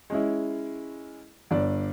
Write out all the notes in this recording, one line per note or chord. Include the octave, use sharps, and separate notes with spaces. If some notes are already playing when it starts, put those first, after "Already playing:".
G#3 C#4 E4
G1 D4 D5